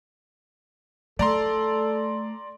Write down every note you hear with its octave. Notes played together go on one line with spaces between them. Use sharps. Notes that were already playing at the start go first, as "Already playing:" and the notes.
A3 A4 D5 A#5 C6